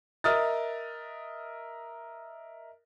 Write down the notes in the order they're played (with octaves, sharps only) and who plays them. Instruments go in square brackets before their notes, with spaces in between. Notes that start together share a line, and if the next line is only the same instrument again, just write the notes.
[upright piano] A#4 D#5 E5 D#6 F6 A6